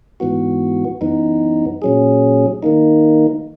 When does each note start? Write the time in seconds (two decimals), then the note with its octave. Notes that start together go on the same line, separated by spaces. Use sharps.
0.20 G#2 E3 B3 F#4
1.01 F#2 E3 B3 D#4
1.82 A#2 F#3 C#4 G#4
2.63 D#3 A#3 D#4